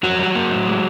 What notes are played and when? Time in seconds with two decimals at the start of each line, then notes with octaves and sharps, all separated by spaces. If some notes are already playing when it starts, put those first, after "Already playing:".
0.03 F2 F#3 F#4
0.19 G3
0.35 A#3
0.51 A2
0.67 G#3